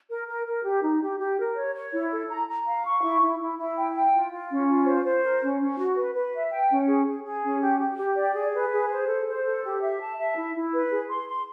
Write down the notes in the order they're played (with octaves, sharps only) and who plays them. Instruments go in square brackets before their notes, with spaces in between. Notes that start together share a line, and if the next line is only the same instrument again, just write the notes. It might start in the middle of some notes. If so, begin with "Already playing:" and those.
[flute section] A#4
A#4
A#4
G4
D#4
G4
G4
A#4
C#5
C#5
E4
A4
A#5
A#5
F5
C#6
E4
E4
E4
E4
G5
G5
F4
F4
C#4
F4
C5
C5
A#4
C#4
C#4
F#4
B4
B4
E5
G5
C#4
G#4
G#4
G#4
C#4
G4
G4
G4
D5
G#4
B4
G#4
C5
A4
C5
A4
G4
E5
A5
E5
E4
E4
B4
G#4
C6
C6